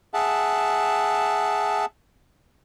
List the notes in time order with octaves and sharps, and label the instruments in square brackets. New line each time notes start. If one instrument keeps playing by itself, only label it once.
[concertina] G#4 E5 F#5 A5